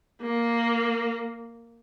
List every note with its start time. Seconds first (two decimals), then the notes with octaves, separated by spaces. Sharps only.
0.22 A#3